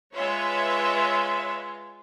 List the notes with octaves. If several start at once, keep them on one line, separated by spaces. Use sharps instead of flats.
G#3 F4 B4 C#5 E5